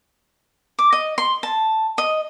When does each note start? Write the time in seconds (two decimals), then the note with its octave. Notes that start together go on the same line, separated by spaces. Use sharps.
0.79 D6
0.93 D#5
1.18 C6
1.43 A5
1.98 D#5